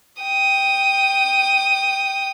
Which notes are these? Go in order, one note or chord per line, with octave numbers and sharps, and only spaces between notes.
G5 D#6